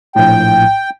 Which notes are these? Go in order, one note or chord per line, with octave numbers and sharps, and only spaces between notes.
A#1 A2 G5